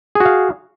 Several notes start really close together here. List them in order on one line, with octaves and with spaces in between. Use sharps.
G#4 F#4 F5